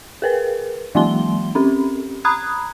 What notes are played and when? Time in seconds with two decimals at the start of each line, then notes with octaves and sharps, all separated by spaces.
0.22 G#4 A#4 B4
0.95 E3 F#3 G#3 A#3 C6 G7
1.55 C4 C#4 G4
2.25 A#5 B5 D#6 F#6 G#6